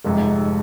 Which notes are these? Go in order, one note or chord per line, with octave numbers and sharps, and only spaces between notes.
F1 F2 G#2 C3